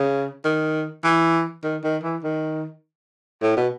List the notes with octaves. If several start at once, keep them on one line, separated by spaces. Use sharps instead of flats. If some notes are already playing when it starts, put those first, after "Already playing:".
Already playing: C#3
D#3
E3
D#3
D#3
E3
D#3
A2
B2